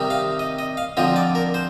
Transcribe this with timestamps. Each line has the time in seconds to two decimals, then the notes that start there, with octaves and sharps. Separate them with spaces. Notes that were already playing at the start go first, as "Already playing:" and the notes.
Already playing: C3 D#3 G3 C4 D#4
0.10 F5
0.39 D#5
0.59 D#5
0.77 F5
0.97 D3 F3 C4 F4 D#5
1.16 D5
1.35 A#4
1.54 C5